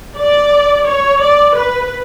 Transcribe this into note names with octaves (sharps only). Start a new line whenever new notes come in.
D5
C#5
D5
B4